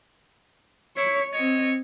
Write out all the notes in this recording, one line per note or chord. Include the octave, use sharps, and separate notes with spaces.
E4 C#5
C4 C#5 D#5